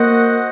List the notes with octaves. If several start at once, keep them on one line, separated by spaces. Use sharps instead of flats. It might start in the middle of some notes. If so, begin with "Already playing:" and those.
Already playing: A#3 F#4 C5 D#5 F#5